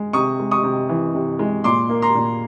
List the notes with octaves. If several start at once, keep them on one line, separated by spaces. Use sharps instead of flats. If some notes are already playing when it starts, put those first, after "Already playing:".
Already playing: G#3
C3 C#6 D#6
G#3
C#6 D#6
C3
E3
C3
G#3
A#2 C6 D6
A#3
A#5 C6
A#2